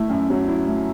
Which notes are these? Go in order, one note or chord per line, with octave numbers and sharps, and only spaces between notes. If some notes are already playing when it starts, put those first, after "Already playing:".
Already playing: A3 E4
F#2
F#3
E4
A3